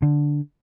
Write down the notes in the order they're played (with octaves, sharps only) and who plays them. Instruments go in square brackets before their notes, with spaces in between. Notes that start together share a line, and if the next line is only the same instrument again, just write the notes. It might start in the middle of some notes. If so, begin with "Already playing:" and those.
[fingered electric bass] D3